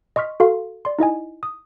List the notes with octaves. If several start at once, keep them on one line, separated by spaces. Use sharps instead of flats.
D#5 C6 C#6 F6 B6
F#4 A4 F5 C6
D5 C6
D#4 E4 D#5 G#5
D#6